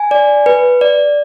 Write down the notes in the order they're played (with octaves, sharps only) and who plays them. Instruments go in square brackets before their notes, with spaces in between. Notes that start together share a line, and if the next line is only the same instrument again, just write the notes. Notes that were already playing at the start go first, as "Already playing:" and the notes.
Already playing: [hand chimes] G#5
D5
B4
D5